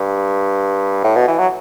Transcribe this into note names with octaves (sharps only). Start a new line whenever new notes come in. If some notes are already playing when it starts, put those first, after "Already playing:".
Already playing: G2
A2
B2
E3
F#3